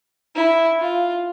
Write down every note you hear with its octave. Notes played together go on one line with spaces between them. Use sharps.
E4
F4